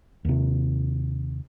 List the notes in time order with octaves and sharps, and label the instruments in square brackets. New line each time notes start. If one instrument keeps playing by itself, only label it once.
[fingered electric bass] D#2 C3